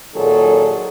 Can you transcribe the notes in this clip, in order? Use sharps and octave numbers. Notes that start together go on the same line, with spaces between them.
A#2 D#3 F#3 G#4 A4